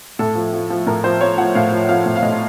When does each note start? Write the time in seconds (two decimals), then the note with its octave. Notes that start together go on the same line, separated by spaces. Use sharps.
0.19 A2 A4
0.35 F3
0.53 F3
0.70 F3
0.87 A2 A#4
1.04 F3 C5
1.20 F3 C#5
1.38 F3 F#5
1.55 A2 F5
1.72 F3
1.89 F3 F5
2.06 A2
2.16 F5
2.23 A2 D#5
2.33 F4